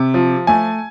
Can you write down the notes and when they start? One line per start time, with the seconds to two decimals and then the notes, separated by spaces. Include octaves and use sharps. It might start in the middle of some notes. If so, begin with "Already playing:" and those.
Already playing: C3
0.14 F3
0.47 A3 G#5